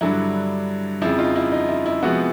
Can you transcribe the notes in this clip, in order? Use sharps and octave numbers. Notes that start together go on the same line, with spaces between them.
G2 D3 F#3 E4
F2 C#3 F3 E4
D#4 F4
E4
D#4
E4
E4
C3 F3 G#3 B3 E4 F#4